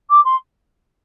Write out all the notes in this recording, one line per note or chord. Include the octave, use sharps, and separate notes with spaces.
D6
C6